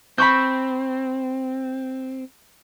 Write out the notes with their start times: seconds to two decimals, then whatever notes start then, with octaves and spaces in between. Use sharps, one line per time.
0.18 C4 B5 C#6 G6